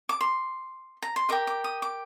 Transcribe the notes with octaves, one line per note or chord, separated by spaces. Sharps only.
D6
C6
A#5
C6
G4 A#4 D#5 D6
D6
D#6
D6